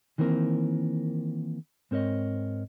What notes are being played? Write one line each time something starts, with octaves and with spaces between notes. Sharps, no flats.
D#3 E3 A#3 C4 A#4
G#2 C4 A#4 C#5 D#5